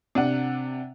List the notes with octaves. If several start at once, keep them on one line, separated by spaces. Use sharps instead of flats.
C3 D4 F#5